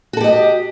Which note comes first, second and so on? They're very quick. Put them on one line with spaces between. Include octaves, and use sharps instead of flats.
F#4 A4 G4 D#5